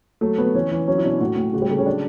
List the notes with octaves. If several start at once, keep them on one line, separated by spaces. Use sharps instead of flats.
F#3 A3
F#3 B3
E3 C#4
E3
F#3 C#4
E4
B2 D4
A2 F#4
A2
C#3 F#4
G3
C#3 A3
C#4
F#3 D4